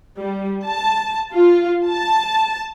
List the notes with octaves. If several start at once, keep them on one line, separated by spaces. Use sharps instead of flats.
G3
A5
F4
A5